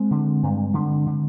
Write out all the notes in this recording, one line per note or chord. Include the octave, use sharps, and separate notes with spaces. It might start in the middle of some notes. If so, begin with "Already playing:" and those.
Already playing: G#3 C4
D3
G2
D3
D3